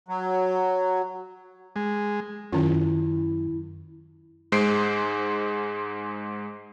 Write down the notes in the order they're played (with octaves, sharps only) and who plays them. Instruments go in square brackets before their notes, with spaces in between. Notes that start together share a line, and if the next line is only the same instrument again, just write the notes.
[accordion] F#3
[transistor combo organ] G#3
[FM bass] F#2 [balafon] D#3 C#4 F4 [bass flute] E4
[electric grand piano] G#2 G#3 C5 C7 D7